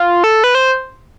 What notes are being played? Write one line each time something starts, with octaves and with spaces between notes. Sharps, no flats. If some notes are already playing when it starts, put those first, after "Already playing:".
Already playing: F4
A4
B4
C5